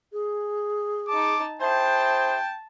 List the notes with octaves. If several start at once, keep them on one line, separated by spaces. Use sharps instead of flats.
G#4
D#4 A5 D6
E4 G#4 C5 E5 G5 A5